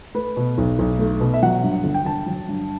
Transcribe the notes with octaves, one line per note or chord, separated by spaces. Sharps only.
A3 B4
B2
B1
B1
A3
B2
E5
F#3 F#5
G2
G1
G5
G1 A5
F#3
G2